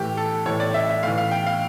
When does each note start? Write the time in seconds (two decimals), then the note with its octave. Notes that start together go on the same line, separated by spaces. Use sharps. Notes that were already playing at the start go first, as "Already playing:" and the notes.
Already playing: A2 E3 G4
0.17 A4
0.46 A2 E3 C#5
0.60 D5
0.74 E5
0.89 E5
1.03 A2 E3 F5
1.18 F5
1.31 G5
1.46 F5